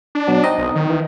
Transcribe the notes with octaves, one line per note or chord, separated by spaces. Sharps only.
D4
B2 F#3
C4 D#4 D#5
B1
D#3
E3